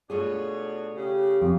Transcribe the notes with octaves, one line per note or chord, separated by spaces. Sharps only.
B2 A3 D4 F4 G#4 C#5
C#3 G4
F2 F5